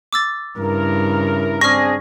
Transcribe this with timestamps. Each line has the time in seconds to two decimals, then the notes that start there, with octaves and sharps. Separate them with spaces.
0.13 D6 E6 A6
0.58 G2 C#3 E4 A#4
1.61 C4 D4 G#4 C#6 F6 A#6